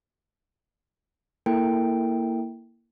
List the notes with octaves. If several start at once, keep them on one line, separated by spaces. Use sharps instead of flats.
A#3 E4 A4 A#4 G5 D7